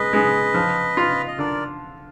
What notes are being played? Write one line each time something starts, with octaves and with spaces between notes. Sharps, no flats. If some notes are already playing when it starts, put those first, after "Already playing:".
Already playing: G#3 B4 D#5
G#3
F3
F4
D#5
D3 A#4 D5